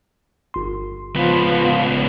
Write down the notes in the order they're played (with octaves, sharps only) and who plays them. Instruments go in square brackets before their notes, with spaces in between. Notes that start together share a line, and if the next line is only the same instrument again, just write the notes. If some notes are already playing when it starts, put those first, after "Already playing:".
[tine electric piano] G1 C6
[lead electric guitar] C#2 B3 [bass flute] F3